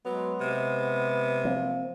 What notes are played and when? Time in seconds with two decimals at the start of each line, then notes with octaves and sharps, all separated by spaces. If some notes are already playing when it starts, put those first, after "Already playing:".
0.05 F#3 G#3 B3
0.41 C3
1.44 F3 A#3 C4